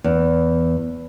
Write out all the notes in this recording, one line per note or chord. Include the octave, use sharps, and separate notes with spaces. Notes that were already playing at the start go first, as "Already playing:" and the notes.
E2